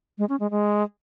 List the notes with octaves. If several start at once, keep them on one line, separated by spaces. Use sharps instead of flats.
G#3
C#4
G#3
G#3